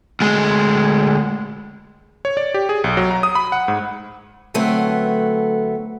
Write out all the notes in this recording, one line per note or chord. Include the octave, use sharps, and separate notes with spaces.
D2 G#3
C#5
D5
G4
G#4
B1
F#3
A#5
D#6
B5
F#5
G#2
D3 F#3 A3 B3 C4